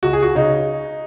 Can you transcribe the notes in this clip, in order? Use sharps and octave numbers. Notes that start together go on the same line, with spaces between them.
C#2 F#4
G#4
F#4
C#3 D#4